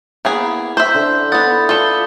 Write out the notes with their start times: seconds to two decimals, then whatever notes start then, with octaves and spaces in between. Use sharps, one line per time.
0.25 A#3 B3 E4 G#4
0.77 C5 E5 C6 G6
0.94 D3
1.32 B3 E4 D5 F#5 D#6 A6
1.69 F4 A4 B4 D5 F5 G6 G7